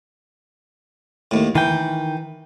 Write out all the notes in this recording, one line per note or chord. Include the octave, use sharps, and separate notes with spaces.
D#2 A2
D#3 E3 G5